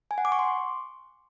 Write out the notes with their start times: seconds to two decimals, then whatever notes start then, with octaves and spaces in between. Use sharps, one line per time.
0.11 G#5
0.18 F#5
0.25 D6
0.32 C#6
0.39 C6